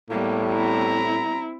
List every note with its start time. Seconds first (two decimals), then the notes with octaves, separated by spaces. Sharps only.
0.10 A2 G3 A#3 B3
0.51 C4 E4 A#5